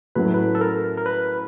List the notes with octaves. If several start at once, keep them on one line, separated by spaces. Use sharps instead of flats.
A2 F#3 A3 C#4 E4 B4
B4
A4
A#4
A#4
B4